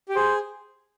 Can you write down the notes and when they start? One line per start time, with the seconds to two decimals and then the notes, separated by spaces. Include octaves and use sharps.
0.09 G4
0.16 G#4 C5